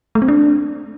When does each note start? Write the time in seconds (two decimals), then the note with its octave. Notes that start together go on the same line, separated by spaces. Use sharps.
0.15 A3
0.22 C4
0.28 D4